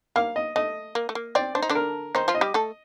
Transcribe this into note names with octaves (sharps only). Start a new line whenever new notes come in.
A#3 F5
D#5
A3 D#5
A#3
A3
A#3
C4 D5
D4 C5
D#4
D3 D4
A#4
D#3 D#4 C5
F3 F4
D#5
G3 G4
A3 A4